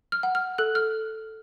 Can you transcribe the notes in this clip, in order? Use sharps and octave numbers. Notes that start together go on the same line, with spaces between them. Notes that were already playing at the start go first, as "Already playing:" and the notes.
F6
F#5
F6
A4 F#6
F6